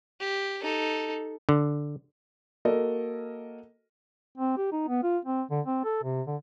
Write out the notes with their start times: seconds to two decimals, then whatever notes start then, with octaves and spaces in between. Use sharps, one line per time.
0.20 G4
0.62 D#4 A4
1.49 D3
2.65 A#3 F#4 A4 A#4 D#5
4.38 C4
4.57 G4
4.72 D#4
4.88 B3
5.03 F4
5.25 C4
5.51 D3
5.66 C4
5.84 A4
6.03 C3
6.27 D3